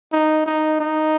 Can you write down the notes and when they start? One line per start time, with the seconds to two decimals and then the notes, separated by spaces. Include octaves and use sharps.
0.13 D#4
0.46 D#4
0.81 D#4